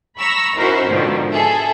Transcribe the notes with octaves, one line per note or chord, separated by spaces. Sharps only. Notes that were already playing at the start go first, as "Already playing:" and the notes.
A#5 B5 C#6 E6 A#6
C#4 D#4 E4 F#4 A#4 C5
G#2 B2 D3 D#3 F3
G#4 A4 E5